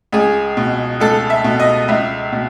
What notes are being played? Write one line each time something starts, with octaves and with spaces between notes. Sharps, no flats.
C#2 G#4
B2
C#2 A4
E5
B2
D#5
C#2 E5
B2